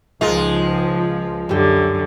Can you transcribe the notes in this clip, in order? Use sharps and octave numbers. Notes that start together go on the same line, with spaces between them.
C#2 D#3 F3 G#3 D#4 F4
F#2 D3 G3 G4